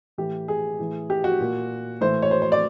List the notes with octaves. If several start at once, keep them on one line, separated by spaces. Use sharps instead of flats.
A2 E3 G4
G#4
A2 E3
G4
F#4
A#2
A2 E3 C5
C#5
C5
C5
D5